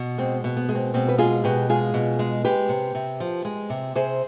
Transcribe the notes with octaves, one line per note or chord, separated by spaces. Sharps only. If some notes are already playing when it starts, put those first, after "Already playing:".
Already playing: B2
G#3 C4
B2
B3
G#3
C4
B2 C4
B4
G#3 F4 G#4
B2 G4 B4
G#3 F4 G#4
B2
G#3
G#3 G4 B4
C3
C3
F3
G#3
C3
C3 G#4 C5